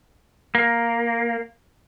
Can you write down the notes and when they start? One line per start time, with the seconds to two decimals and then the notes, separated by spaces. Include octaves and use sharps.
0.55 A#3